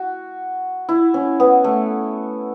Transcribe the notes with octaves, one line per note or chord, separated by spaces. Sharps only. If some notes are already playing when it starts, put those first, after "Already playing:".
Already playing: F#4
E4
C#4
B3
A3